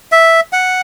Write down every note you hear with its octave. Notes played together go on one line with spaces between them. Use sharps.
E5
F#5